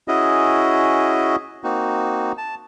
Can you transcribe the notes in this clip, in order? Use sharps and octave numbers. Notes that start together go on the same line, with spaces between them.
C#4 E4 F#4 G#4 D#5
A#3 C4 D#4 F#4
A5